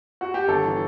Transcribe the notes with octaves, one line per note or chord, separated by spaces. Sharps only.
F#4
G4
G1 A4
E3